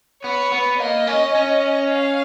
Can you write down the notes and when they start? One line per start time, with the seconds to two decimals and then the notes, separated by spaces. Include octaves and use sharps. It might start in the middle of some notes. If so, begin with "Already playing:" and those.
0.23 B3 C#5
0.52 B3
0.79 A#3 D#5
1.07 C#4
1.35 C#4
1.90 F5